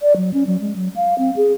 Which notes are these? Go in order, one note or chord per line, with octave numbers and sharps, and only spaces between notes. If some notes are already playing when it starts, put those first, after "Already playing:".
D5
F#3
C#4
F#3
G#3
F#3
F5
C4
G#4